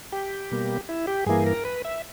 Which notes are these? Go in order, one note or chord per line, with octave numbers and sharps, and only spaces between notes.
G4
B2 G3 A#3
E4
G4
G2 E3 A#3 G#4
A#4
B4
E5